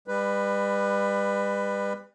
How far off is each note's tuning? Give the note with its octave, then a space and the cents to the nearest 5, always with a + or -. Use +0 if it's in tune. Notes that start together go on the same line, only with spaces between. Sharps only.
G3 +35 B4 +5